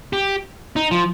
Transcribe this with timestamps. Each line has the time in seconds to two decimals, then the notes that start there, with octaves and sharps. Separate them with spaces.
0.13 G4
0.76 D#4
0.91 F3